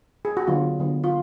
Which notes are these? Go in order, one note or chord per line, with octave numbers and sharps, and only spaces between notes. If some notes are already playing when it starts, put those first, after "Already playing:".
G#4
F#4
D3 F#3 B3 F4
D3 F#3 B3
F4